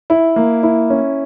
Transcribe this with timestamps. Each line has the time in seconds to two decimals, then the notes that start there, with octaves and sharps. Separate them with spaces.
0.10 E4
0.36 A#3
0.63 E4
0.90 C#4